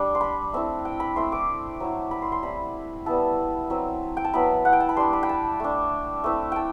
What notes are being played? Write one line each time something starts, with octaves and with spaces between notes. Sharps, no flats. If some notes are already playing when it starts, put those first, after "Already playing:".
Already playing: G3 D4
C6
B5
A3 C4 E4
G5
B5
A3 C4 E4 C6
D6
F#3 C4 E4
B5
C6
C6
G3 C4 E4 B5
G3 B3 E4 A5
F#3 C4 E4
G5
A5
F#3 B3 E4 B5
F#5
G5
A5
B5
G3 D4 C6
B5
G5
A5
A3 D4
A3 C4 E4
G5 A5